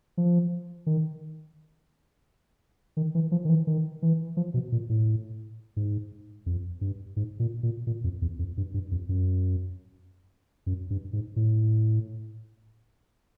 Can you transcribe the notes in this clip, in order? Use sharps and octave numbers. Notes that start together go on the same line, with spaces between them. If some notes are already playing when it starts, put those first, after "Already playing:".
F3
D#3
D#3
E3
F3
D#3
E3
D#3
E3
F3
B2
A#2
A2
G#2
F2
G2
G#2
A#2
A#2
A#2
F2
E2
F2
G2
G2
F2
F#2
F#2
G2
G#2
A2